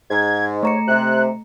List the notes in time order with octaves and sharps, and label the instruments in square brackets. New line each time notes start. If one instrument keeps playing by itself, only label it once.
[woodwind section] G#2 [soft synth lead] G#6
[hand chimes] A3 A#5 C#7 [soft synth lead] C#5
[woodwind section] C3 [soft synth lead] F#6